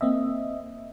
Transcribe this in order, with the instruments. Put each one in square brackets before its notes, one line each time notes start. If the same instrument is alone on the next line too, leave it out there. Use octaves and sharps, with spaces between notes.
[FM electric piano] A#3 C4 D#5 E5